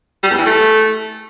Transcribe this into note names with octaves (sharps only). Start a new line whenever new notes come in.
G3
E2
E3
A3